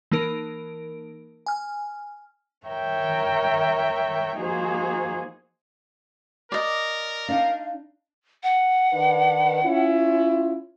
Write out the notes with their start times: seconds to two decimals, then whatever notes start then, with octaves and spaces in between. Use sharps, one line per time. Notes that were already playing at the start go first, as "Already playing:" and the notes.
0.12 E3 A#3 D#4 A#4 D7
1.46 G#5 F6
2.68 A#4 C#5 E5 G5
4.36 F3 A#3 D#4 F#4 G#4 C5
6.52 A#4 D5 D#5
7.29 D4 D#4 F5
8.43 F#5
8.93 D#3 D4 B4
9.63 C#4 E4 F4